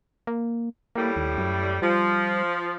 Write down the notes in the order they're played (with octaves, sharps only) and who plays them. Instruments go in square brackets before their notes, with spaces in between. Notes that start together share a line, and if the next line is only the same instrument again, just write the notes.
[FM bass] A#3
[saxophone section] A2 G3 [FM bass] A#3
[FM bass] D#2
F#2
[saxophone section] F3 [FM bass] G3